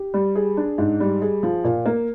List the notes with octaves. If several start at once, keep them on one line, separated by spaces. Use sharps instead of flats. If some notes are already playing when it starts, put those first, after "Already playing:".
Already playing: G4
G3
G#4
D4
G#2
G3
G#4
F3
A#2
A#3